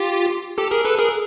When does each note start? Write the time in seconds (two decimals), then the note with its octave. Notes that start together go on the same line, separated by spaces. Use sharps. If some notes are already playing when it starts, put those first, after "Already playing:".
Already playing: F4 G4
0.58 G4 A4
0.71 G#4 A#4
0.85 A4 B4
0.99 G#4 A#4